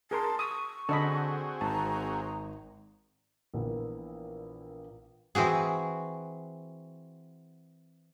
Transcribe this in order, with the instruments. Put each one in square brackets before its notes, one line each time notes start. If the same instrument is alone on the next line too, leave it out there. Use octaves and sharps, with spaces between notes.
[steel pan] G#4 A#4 C6 [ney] A5
[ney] C#6 [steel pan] D#6 E6
[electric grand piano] D3 [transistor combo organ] C4 F#4 G#4 [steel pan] A4 D#5 B5
[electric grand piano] G#1 [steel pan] A5 [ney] A#5
[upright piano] A#1 A#2 E3 A#3 B3
[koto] E3 C4 F#4 G#4